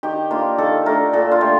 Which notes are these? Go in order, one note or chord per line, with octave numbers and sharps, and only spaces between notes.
D#3 G4
A#3 D4 F4
D#3 A4
A3 D4 A#4
A#2 A4
F4
A3 G4